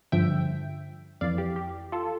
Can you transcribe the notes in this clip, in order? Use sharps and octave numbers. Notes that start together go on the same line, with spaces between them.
G2 D3 F3 E5 G5
F2 E3 D5 F5
G4
G4
F4 A4